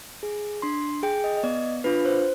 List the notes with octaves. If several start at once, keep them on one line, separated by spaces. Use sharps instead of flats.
G#4
D4 C6
G#4 G5
D#5
D#5
B3 D5
D4 F4 B4
C5